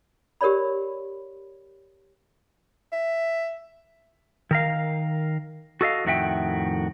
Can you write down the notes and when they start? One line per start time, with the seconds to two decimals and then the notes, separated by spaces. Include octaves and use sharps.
0.41 G4 A#4 C#5 D5 B5
2.92 E5
4.51 D#3 A#4 F5
5.81 F#4 A4 D#5 F5
6.05 F2 A2 D#3 F#4 E5 G5